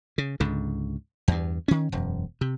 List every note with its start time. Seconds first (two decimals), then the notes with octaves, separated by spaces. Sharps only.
0.18 C#3
0.40 C#2 G#2 D3
1.28 E2 G2
1.68 D#3 C#4
1.92 E1 F#2
2.41 C3